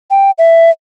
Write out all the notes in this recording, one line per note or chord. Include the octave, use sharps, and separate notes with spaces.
G5
E5